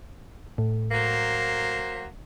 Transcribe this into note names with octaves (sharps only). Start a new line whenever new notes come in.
A2
F#3 A#3 C5